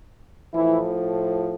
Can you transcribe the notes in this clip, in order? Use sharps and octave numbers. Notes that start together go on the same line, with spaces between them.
A2 E3 F3 E4